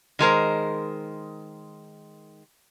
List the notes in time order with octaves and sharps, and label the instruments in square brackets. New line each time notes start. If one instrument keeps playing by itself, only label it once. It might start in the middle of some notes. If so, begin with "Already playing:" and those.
[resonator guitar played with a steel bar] D#3 G#3 A#4 C5